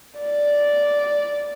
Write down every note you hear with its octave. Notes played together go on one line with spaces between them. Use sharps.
D5